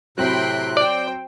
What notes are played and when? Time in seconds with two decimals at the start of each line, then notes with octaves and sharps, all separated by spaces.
0.18 A2 C3 F#3 C4 G5 B5 C6 F#6
0.77 C5 D5 G5